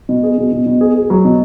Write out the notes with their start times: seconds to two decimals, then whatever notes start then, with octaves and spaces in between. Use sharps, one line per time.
0.09 B2
0.23 G#4
0.38 B2
0.52 B2
0.66 B2
0.81 G#4
0.95 G#4
1.10 F#3
1.25 B2